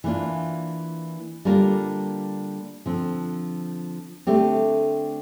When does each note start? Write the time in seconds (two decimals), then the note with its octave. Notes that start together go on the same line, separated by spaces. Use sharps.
0.04 E3 A#3 D4 F4
1.45 D3 G3 A#3 F4 A#4
2.86 D3 F3 C4
4.27 D3 A3 C4 G4